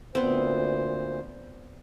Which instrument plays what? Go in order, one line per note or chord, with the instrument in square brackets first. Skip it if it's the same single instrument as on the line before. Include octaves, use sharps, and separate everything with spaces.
[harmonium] D2 A#2 C5 [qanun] B3 C4